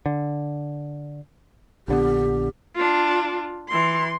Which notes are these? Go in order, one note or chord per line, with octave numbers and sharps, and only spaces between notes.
D3
A#1 D3 B3 G4
D4 F4
E3 C6